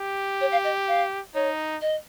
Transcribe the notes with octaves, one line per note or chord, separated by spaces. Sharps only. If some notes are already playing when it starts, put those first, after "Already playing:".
Already playing: G4
C#5
F5
D#5
F5
D#4 C#5
D#5